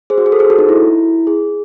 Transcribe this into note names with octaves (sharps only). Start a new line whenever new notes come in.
G#4 C5
F#4
G#4
A4
G#4 C5
F#4 A4
D#4
E4
G#4